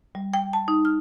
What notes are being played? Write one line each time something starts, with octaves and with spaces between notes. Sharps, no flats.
G3
G5
A5
D#4
F6